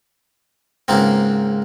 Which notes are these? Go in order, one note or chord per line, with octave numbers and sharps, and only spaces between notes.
C#2 G#2 A#3 C4